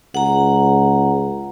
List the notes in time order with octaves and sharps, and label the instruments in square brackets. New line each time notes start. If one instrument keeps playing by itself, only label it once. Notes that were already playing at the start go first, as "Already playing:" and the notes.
[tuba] C#2 [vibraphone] F#5 A#5